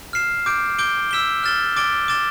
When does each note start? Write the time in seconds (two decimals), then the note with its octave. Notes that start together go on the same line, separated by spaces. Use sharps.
0.13 F6 C7 E7
0.46 D6 G6 D7
0.79 D6 G6 D7 G7
1.11 E6 B6 E7 G7
1.44 F6 A6 E7 G7
1.77 D6 A6 D7 G7
2.08 D6 A6 E7 G7